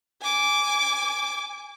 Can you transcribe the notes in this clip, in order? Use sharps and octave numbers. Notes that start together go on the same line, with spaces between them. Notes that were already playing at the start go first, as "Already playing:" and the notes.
G#5 D6